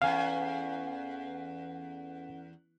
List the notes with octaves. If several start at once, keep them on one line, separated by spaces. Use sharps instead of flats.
E2 C#4 A4 F5 F#5 G#5